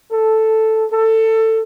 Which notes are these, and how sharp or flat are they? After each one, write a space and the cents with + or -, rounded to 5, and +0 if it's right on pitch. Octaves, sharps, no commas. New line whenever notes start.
A4 +0
A4 +20